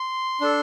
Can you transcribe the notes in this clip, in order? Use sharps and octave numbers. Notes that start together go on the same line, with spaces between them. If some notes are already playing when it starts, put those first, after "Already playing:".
Already playing: C6
D4 A4